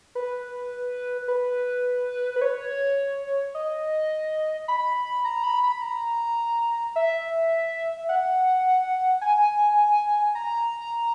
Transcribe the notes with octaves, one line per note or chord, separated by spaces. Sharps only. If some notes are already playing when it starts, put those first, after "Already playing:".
B4
B4
B4
C#5
D#5
B5
A#5
B5
B5
A#5
E5
F#5
G#5
A#5